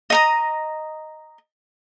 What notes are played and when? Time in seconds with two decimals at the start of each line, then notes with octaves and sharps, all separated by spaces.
0.10 D#5 A#5 D#6